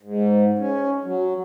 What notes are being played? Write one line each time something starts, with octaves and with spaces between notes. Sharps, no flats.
G#2
C#4
F#3